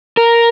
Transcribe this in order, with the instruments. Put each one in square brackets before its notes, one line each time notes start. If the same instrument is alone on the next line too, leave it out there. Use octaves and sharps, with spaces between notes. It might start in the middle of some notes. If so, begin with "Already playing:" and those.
[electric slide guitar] A#4